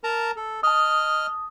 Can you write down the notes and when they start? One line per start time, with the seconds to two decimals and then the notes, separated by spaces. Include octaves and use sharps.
0.04 A#4 A5 A#5
0.36 A4
0.63 D#5 A5 D#6 F6